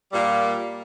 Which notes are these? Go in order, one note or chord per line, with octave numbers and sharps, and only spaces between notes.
A#2 G3 A#3